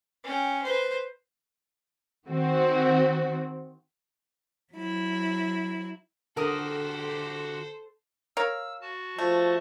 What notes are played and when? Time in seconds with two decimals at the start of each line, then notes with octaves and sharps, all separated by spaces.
0.24 C#4 G5
0.63 B4 C5
2.27 D#3 C4 F#4
4.74 F#3 E4
6.37 D3 F#4 G4 A4 A#4 C5 D#6
8.37 A#4 C#5 F5 E6
8.81 F#4 A5
9.18 F3 A3